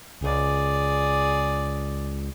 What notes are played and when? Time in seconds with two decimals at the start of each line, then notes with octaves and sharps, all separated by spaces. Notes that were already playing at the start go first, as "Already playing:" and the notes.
0.21 C#2 G#4 D5